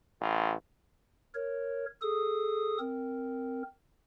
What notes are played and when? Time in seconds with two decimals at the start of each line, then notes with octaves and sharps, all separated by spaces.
0.21 A1
1.34 A#4 C#5
2.02 G#4 A4 D#6
2.79 C4 A#4